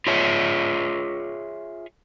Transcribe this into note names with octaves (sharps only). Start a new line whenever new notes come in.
F4 G#4 C#5 E5